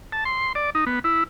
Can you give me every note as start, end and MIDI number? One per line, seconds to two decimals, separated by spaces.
0.12 0.24 81
0.25 0.53 84
0.55 0.70 74
0.75 0.85 63
0.87 0.99 59
1.04 1.24 64